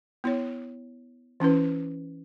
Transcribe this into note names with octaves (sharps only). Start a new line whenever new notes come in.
B3 E4 C#5
E3 C#4 E4 B4